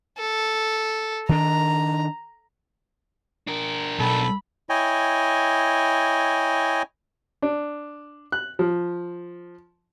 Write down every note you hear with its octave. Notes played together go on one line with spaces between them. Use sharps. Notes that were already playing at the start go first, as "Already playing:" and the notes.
A4
D#3 D4 A#5
D4 A#4
B1 A4 B5
E4 C#5 D#5 G5 G#5
D4
F#6
F3